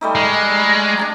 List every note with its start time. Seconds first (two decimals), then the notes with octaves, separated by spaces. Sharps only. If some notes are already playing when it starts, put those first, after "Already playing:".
0.01 G3 A3 D#4
0.15 G#3
0.97 D4 A5 A#5